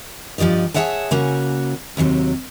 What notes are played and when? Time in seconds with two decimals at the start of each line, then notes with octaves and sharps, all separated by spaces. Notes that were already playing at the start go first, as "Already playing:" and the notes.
0.38 G2 F3 G4 D5 D#5
0.74 G#4 A#4 C#5 E5 F#5 A5
1.11 C#3 A#3 C#4 F#4
1.97 D#2 C3 F3 F#3